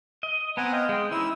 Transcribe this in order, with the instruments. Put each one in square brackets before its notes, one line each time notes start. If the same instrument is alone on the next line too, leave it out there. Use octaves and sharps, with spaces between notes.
[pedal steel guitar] D#5
[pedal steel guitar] B3 C4 [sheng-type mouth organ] F#5 G#5 A#5
[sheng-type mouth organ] D#5 F5 G5
[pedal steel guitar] G#3 G5 [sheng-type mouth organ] D#5
[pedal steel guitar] E3 C#4 D#4 [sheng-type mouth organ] E4 E6